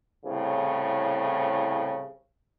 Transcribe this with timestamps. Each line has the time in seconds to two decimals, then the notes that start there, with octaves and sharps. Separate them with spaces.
0.25 C2 A2 C#3